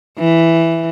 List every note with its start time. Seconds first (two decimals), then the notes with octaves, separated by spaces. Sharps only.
0.18 E3